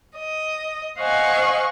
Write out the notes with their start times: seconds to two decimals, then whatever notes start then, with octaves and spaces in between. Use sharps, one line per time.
0.18 D#5
0.98 C5 D#5 F5 F#5 G#5 C#6